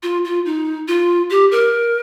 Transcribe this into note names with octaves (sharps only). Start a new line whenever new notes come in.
F4
F4
D#4
F4
G4
A#4